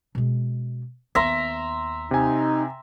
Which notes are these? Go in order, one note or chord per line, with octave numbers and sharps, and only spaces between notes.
B2 G#3
D#2 B3 E5 A#5 C6
C3 D#4 G#5